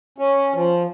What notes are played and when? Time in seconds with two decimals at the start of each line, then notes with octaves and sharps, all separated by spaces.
0.18 C#4
0.54 F3